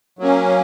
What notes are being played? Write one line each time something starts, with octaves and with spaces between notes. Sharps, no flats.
F#3 A#3 C#4